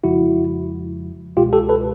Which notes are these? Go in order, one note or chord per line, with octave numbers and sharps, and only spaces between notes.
F2 C#3 F3 G#3 E4 F#4
C#2 B2 G#3 F4 G4
G4 A4
A4 B4